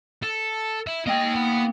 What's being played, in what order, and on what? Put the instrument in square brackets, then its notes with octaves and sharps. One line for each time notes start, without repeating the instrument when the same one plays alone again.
[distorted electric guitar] A4
E4 E5
[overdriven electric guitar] A#3 G5 [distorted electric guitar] D#5 G#5
[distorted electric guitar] B3